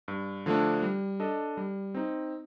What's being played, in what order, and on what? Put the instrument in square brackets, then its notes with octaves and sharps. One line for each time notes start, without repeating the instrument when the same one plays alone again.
[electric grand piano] G2
D3 F3 A3 D4
G3
D4 A4 D#5
G3
C4 D#4